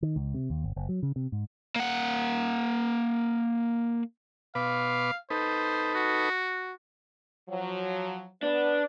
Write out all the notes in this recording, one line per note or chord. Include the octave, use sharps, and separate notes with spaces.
D#3
C#2
C3
D#2
G1
F#1
F#3
C#3
C3
G#2
A#3 F#5
B2 B4 F5 D6
D#4 A4 B4 C5
F#4
F3 F#3
B3 D4 B4